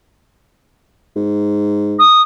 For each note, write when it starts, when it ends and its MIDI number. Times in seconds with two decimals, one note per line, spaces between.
1.16 2.01 44
1.98 2.21 87